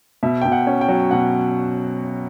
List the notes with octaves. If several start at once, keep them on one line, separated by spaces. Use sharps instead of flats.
B2 E5
B2 G5
F#5
C#4
G5
F#3
B2 F#5